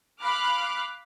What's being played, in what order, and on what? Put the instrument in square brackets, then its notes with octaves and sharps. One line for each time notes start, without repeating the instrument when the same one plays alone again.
[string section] F5 B5 D6 F6 F#6